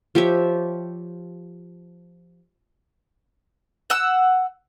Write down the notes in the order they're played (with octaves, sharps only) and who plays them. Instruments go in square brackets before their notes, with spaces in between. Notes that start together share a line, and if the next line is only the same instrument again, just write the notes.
[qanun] F3 G4 C#5 E5
[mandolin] F#5 E6